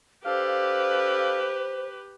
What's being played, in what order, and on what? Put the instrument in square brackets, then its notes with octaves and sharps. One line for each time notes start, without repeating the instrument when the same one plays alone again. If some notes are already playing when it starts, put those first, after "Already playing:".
[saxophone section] D4 A4 F5 [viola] G4 B4 [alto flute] C5